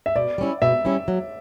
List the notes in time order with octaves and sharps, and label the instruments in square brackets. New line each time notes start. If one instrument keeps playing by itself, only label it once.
[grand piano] E5
[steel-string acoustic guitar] B2 [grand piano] D5
[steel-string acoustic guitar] G3 C#4 E4
[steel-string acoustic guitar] B2 [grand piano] E5
[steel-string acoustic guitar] G3 C#4 E4
F#3